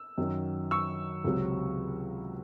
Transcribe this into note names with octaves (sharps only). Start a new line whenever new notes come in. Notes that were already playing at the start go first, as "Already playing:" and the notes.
Already playing: E6
F#2 D#3 F#3
C#6 E6
C#2 C3 F#3